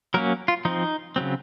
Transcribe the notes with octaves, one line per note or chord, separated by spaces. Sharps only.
F#3 A#3 C#4 A#4
F4
F3 C4 D#4
C#3 F#3 C4